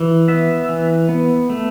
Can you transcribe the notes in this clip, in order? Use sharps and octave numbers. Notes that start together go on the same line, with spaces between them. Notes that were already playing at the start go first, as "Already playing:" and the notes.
Already playing: E3
B3 E5
E3
B3
A3